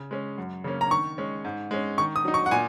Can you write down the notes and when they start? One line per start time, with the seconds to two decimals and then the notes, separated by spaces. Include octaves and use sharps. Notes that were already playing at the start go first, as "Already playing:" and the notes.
Already playing: C#3
0.11 G#3 C#4
0.38 F#2
0.64 C#3 A#3 C#4
0.81 A#5
0.91 D#3 C#6
1.18 G#3 C#4
1.45 G#2
1.71 G#3 C#4
1.98 D#3 C#6
2.16 D#6
2.25 F#3 D#4
2.34 C#6
2.46 F#5
2.51 A#2 G#5